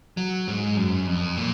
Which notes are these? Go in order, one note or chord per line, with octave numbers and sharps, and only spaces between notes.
F#3
G#2
F#2
F2
A#2